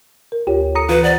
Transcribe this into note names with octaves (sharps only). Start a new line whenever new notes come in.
A#4
D2 F4 G4 C#5
A4 A#5 D#6 C#7
E3 F4 B4
C5 D5 F#5 A#5